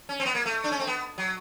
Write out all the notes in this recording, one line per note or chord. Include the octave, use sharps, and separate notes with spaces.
C#4
C4
B3
A#3
A3
D4
C#4
C4
B3
F#3